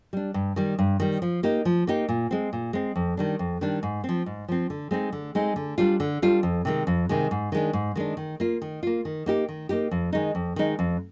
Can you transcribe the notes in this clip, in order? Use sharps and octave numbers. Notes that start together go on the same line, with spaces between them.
G3 D4
G2
D#3 G3
G2
D#3 G3
F3
A#3 D#4 G4
F3
A#3 D#4 G4
A#2
G#3 C4
A#2
G#3 C4
F2
D#3 G3 D4
F2
D#3 G3 D4
G#2
F3 C4
G#2
F3 C4
D3
G#3 C4 D#4
D3
G#3 C4 D#4
D3
G3 D4 F4
D3
G3 D4 F4
F2
C3 D#3 G#3
F2
C3 D#3 G#3
G#2
D#3 G#3 D4
G#2
D#3 G#3 D4
D#3
A#3 F4
D#3
A#3 F4
D#3
A#3 D#4 G4
D#3
A#3 D#4 G4
F2
D#3 G#3 D#4
F2
D#3 G#3 D#4
F2